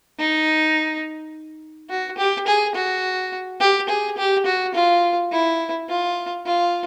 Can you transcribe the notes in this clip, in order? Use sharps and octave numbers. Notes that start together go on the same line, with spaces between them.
D#4
F#4
G4
G#4
F#4
G4
G#4
G4
F#4
F4
E4
F4
F4